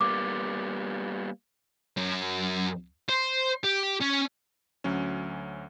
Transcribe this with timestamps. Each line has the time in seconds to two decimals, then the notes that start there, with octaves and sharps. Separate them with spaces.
0.01 G3 A#3 B3 D6
1.97 F#2
3.09 C5
3.64 G4
4.01 C#4
4.84 D2 F#3 C#4